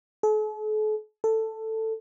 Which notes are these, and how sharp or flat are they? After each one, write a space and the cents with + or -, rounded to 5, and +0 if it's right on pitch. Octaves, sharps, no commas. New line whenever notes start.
A4 -45
A4 +10